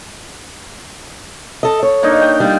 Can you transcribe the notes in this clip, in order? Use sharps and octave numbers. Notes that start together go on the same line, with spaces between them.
A4 D#5
C#5
A#3 D4 D#4
G5
G3 F4